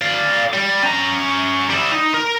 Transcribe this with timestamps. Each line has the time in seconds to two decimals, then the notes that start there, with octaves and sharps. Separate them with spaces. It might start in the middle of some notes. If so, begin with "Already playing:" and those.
0.01 D5 F5
0.53 G3
0.83 C#4 A#5
1.70 G3 E4
1.92 D#4
2.14 A#4